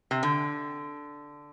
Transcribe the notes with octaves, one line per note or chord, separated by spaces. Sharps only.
C3
D3